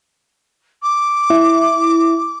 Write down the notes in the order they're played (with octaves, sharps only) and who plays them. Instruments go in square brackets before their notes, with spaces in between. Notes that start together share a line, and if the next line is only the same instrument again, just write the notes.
[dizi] D6
[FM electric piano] E4